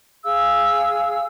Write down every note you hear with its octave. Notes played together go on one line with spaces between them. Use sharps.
G#4 F5 E6